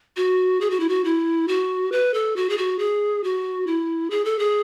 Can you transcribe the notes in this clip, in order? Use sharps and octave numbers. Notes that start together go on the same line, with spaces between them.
F#4
G#4
F#4
E4
F#4
E4
F#4
B4
A4
F#4
G#4
F#4
G#4
F#4
E4
G#4
A4
G#4